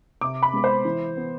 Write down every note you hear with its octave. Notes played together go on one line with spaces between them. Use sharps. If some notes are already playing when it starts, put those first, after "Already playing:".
C3 D6
B5
G#3 B3
C5
E3
B3